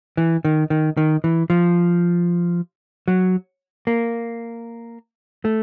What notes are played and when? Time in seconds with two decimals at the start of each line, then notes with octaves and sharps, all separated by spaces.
0.17 E3
0.45 D#3
0.70 D#3
0.97 D#3
1.24 E3
1.50 F3
3.08 F#3
3.87 A#3
5.45 A3